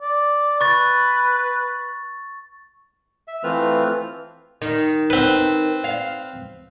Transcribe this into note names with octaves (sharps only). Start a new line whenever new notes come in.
D5
B4 C#6 A6
E5
E3 A3 C4 F4 B4 F6
D#3
C4 B4
F5